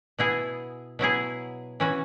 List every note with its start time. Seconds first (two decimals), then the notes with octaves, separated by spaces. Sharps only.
0.19 B2 B3 E4 G#4
0.99 B2 F#3 E4 G#4
1.80 E3 C#4 F#4